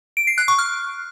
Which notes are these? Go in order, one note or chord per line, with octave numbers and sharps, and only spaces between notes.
D7
C7
F#6
C#6
F6